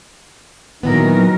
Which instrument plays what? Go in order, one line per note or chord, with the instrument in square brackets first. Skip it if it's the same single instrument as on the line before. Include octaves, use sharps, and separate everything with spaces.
[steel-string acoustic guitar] A#2 E3 B3 [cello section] D#3 F#3 A#4